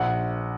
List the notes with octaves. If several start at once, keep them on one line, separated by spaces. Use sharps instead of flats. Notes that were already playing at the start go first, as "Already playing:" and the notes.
Already playing: A#1 F#5